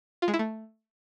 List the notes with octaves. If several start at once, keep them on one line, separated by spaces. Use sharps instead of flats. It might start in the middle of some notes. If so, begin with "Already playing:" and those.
F4
G#3
E4
A3